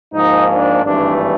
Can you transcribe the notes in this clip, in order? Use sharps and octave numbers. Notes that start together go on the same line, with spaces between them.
G#2 F3 A#3 D#4
D4
G#1 G2 E3 A3 D4